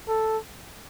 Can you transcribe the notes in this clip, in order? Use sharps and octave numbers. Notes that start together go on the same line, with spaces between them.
A4